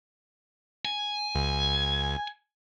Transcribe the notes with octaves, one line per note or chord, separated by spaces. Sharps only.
G#5
C#2